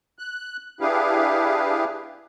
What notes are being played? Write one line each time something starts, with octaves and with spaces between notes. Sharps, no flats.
F#6
D4 E4 G4 G#4 B4 F5